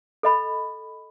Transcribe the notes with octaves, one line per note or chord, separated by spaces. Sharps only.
A4 D#5 B5